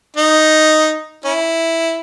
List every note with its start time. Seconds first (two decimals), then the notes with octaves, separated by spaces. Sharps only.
0.17 D#4
1.25 C#4 E4